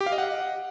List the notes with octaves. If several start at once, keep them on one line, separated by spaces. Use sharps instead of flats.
G4
F5
D#5
F#5